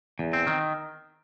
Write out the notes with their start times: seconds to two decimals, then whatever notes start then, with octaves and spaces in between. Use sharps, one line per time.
0.19 E2
0.33 C4
0.47 D#3